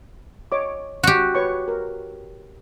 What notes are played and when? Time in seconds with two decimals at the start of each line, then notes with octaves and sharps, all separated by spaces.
0.52 C#5 D#5 D6
1.03 F#4 G4
1.35 B4 C#5 C#6
1.68 A#4